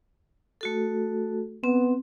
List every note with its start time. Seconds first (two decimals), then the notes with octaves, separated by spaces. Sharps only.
0.61 A3 F#4 A4
1.64 B3 C4